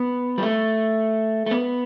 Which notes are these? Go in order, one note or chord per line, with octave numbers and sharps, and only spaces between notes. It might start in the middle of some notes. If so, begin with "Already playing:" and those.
Already playing: B3
G3
A3
A3
B3